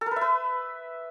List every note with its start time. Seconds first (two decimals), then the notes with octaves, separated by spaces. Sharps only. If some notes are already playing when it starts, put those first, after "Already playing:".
0.01 A4
0.06 A#4
0.11 B4
0.16 E5
0.21 B4